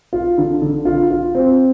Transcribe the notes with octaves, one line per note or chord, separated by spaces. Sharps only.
F4
D3
D3
F4
F4
C4